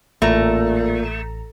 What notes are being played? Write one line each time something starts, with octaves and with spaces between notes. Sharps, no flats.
A1 A#2 A3 A#5